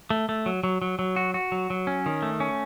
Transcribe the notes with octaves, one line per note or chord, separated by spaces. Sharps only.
A3
A3
F#3
F#3
F#3
F#3
F#4
F#4
F#3
F#3
C#4
D#3
A3
C#4